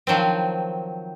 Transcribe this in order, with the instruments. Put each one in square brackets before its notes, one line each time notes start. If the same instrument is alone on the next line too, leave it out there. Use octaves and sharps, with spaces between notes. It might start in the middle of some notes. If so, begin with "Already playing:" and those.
[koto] D#3 F3 F#3 C4